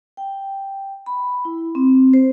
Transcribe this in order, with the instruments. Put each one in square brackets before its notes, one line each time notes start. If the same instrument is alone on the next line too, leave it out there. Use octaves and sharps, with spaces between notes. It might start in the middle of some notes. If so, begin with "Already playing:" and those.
[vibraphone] G5
B5
E4
C4
C5